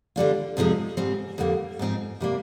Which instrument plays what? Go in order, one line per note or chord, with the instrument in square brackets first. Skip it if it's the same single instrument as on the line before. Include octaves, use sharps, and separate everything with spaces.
[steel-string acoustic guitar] D3 G3 A#3 D4 F4
F2 C3 F3 G#3 D#4
G#2 G3 C4
F2 D3 G3 A#3
G#2 F3 C4 D#4
C3 G3 A#3